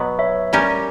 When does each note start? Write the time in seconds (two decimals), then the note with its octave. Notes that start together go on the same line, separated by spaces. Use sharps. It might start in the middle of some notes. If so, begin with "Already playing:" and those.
Already playing: B2 F#3 B3
0.19 C#5 E5
0.53 G3 C#4 G4 A#4